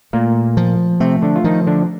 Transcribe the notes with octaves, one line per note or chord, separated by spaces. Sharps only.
A#2 A3 A#3
F3
C3 A3 C4
D3 D4
F4
D#3 F3 D#4
D3 D4